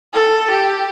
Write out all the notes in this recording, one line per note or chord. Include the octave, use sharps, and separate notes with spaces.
A4
G4